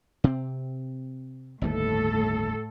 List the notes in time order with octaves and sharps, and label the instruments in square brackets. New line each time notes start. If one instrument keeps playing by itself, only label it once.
[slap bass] C3 C4
[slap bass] G1 D#2 A3 [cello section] A2 A4